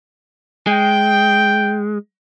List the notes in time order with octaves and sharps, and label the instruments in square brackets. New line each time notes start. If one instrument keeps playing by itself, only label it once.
[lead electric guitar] G#3 [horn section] G5